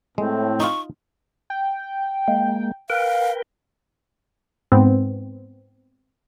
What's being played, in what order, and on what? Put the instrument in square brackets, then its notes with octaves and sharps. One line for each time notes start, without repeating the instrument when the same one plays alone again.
[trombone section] A2 [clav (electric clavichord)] G#3 [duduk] C4
[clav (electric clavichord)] D#4 F4 [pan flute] C#6
[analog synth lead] G5
[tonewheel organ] G#3 A#3
[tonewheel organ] A#4 B4 G5 [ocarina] F5
[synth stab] G#2 B3 C4